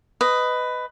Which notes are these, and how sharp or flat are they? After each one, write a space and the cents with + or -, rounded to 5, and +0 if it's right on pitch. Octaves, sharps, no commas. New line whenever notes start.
B4 +15 D#5 +0